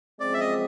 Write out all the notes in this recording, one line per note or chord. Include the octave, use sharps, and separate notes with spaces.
F#2 C#3 F3 G#3 C4 D5
E5
D#5